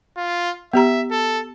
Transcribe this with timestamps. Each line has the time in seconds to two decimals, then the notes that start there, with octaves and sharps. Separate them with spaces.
0.17 F4
0.73 B3 G4 E5 A#5
1.11 A4